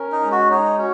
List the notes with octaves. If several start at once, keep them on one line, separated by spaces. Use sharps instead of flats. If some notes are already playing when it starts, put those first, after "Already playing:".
Already playing: C#4 A#4
D#4
G#3
F#4
D#4 C#5
C#4 F#4